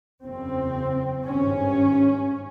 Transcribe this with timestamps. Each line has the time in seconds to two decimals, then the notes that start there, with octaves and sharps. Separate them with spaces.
0.23 F#1 E2 C#3 C4
1.26 G#1 G2 C#4